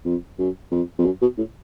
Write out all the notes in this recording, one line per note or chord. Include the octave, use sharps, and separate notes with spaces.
F2
F#2
F2
F2
F#2
B2
A2